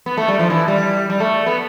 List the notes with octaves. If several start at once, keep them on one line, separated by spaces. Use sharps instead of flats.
B3
A3
G3
F3
E3
G3
G3
A3
B3